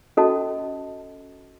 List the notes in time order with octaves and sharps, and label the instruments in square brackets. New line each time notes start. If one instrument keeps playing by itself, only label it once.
[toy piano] C#4 F#4 A4 D#5 A5